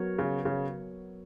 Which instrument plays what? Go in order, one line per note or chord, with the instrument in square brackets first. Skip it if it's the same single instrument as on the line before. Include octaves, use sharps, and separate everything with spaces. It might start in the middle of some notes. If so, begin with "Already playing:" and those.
Already playing: [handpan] F#3 B3 F#4 A#4 C#5
[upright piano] C#3
C#3